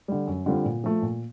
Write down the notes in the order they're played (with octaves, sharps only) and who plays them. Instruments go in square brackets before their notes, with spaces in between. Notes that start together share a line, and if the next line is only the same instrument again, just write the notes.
[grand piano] D3 G3
F#2
D3 G3 C4 F4
A#2
F3 A3
A#2